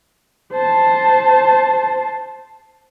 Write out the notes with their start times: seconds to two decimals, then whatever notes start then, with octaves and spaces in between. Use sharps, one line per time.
0.52 C5 A5